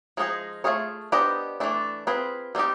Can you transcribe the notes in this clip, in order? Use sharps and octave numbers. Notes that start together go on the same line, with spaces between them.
F3 G#3 B3 D#4 G#4
A3 C4 F4 G#4 C#5
B3 D4 G4 C5 D#5
E3 A3 D4
C4 F4 G#4 B4
G3 C4 D#4 G4